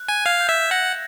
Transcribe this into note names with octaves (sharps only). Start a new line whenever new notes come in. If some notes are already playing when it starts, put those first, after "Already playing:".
Already playing: F#6
G#5
F5 G#6
G6
E5 G#6
F#5 A#6